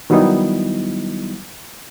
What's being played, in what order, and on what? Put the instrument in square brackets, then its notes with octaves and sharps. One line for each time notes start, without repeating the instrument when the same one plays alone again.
[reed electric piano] D#3 F#3 G3 B3 D#4 E4